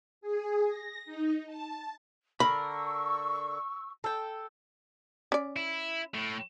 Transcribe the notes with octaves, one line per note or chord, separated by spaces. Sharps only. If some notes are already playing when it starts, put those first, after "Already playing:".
G#4
A#6
D#4
A5
D3 A#4 B5 C#6 E6
A4 G5
C#4 D5
E4
A2